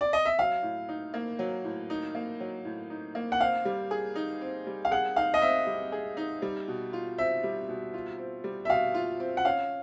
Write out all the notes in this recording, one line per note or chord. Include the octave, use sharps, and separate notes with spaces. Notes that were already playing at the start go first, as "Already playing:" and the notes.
D5
D#5
E5
F#3 F5
A2
D#4
A#3
F#3
A2
D#4
A#3
F#3
A2
D#4
A#3
F#5
C4 F5
G3
G#4
D#4
C4
G3
F5
G#4 F#5
D#4 F5
D#5
C4 E5
G3
G#4
D#4
G3
B2
F4
C4 E5
G3
B2
F4
C4
G3
E5
B2 F5
F4
C4
F#5
C#4 F5